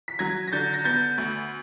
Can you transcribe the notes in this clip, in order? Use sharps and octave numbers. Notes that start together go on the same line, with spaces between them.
B6
F#3 G#6 A#6
A#6
D3 G6 A6
A#6
B3 G6 A6
D2